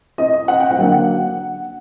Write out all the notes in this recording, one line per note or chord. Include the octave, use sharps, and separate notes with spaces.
D#5
F#5
G5
F#5
D3 F#3 A#3